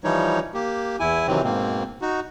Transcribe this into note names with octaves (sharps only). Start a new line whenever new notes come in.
E3 F3 G3 D#4 C#5
A#3 G4
E2 E4 G#5
C3 D#3 E3 F#3 C4
G#2 B2 A#3 C4
D#4 F#4